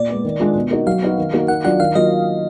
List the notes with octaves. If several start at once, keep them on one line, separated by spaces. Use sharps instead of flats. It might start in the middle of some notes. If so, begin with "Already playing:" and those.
Already playing: A#2 D5
G#3 B3
D#3
G#3 D4 F4
B2
A#3 D#4 F#4
F#3 F5
B3 D#4 F#4
D#3
A#3 D#4 F#4
D#3 F#5
F#3 D4 F4 F#5
D#3 F5
F#3 A#3 F4 D#5